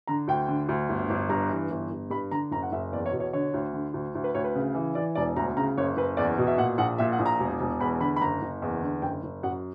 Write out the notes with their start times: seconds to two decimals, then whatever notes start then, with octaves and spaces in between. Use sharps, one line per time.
0.07 D3 A#5
0.28 D2 G5
0.48 D3
0.69 D2
0.89 G1
1.10 G1
1.29 G2 A#5
1.50 E3
1.70 G1
1.91 G1
2.10 G2 B5
2.31 D3 A#5
2.51 F#1 A#5
2.63 F#5
2.72 F#1 E5
2.92 E2 D5
3.06 C#5
3.12 B2
3.20 C#5
3.33 D3 C#5
3.54 D2
3.73 D3
3.94 D2
4.15 D2
4.24 B4
4.35 D2 C#5
4.44 B4
4.55 C#3
4.75 E3
4.95 E3 D5
5.15 E1 D5
5.36 D2 A#5
5.57 C#3 A#5
5.78 F#1 C#5
5.97 F#1 B4
6.17 E2 D5
6.38 B2
6.47 E5
6.58 A#2 F#5
6.78 A#1 F#5
6.98 A#2 E5
7.12 F#5
7.19 A#1
7.26 A#5
7.40 E1
7.60 E1
7.80 E2 B5
8.00 D3 B5
8.16 B5
8.21 F#1 A#5
8.42 F#1
8.62 E2
8.82 D3
9.02 F#1 G5
9.23 F#1
9.43 F#2 F#5